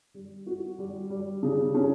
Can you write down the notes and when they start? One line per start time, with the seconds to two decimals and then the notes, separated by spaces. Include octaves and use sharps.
0.14 G3
0.46 F#4
0.79 G3
1.10 G3
1.43 C#3
1.74 C#4